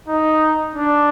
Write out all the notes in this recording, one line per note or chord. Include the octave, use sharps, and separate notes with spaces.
D#4
D4